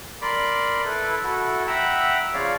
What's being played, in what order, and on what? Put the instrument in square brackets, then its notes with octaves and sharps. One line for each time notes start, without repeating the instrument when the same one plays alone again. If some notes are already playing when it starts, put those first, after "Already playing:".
[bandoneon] A#4 D5 B5 C6 D6
E4 A4 B4
E4 F#4 A4
E5 F#5 G5 A#5 B5 E6
C#3 F3 C#5 D5 F5